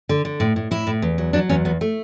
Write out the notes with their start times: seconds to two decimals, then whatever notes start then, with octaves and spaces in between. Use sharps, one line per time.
0.09 D3
0.25 D3
0.40 A2
0.56 A2
0.71 A2 E4
0.87 A2
1.02 E2
1.18 F#3
1.33 F#3 D4
1.49 E2 C#4
1.65 E2 B3
1.81 A3